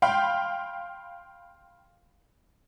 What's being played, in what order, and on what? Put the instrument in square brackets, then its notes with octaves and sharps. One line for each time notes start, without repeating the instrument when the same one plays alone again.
[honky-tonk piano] F5 G5 B5 C6